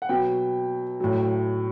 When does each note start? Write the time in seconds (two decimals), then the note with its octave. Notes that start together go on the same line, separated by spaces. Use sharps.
0.02 F#5
0.09 B2 F#3 G5
1.00 A2 F#3